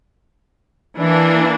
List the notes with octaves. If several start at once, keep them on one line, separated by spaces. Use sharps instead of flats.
E3 A#3 D4